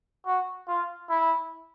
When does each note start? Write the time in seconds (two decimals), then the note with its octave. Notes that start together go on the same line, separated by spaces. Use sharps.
0.26 F#4
0.67 F4
1.09 E4